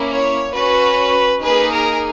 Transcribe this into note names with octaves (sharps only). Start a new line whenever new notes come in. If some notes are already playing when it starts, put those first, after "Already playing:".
Already playing: A#3 C#4 E4
C#5
C#4 F#4 B4
A#3 D#4 G#4 B4
A#4